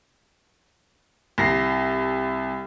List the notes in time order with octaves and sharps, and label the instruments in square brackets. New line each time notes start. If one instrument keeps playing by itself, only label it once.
[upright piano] C2 A#6 C7